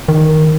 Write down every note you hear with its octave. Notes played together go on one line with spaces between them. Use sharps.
D#3